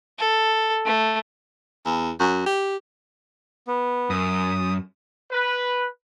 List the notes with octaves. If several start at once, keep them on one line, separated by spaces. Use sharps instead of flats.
A4
A3
E2
F#2
G4
B3
F#2 D#6
B4